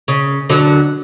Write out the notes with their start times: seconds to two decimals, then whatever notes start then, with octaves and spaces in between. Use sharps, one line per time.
0.08 C#3
0.50 D3 F#3